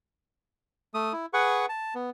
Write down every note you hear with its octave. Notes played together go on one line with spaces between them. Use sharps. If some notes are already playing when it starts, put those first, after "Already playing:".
A3 D#6
E4
G#4 B4 F#5 C#6
A5
B3